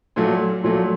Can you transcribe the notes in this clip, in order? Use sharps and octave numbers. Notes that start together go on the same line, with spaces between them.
A#2 F#3 A3
A#2 F#3 A3